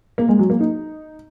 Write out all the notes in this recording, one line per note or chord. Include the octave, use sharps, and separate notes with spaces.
A#3
G#3
F#3
A#3
D#4